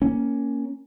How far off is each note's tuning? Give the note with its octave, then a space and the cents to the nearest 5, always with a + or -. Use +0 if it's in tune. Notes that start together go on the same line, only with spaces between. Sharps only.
A#3 +0 C#4 +0